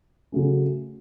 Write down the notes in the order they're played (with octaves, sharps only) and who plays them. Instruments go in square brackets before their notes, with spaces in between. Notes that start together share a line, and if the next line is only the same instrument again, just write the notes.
[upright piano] C#3 F#3 A3 C#4